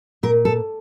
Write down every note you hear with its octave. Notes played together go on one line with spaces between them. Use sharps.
A#2 A#4
A4